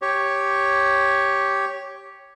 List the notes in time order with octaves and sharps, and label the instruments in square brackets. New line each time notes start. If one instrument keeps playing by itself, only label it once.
[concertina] G4 C#5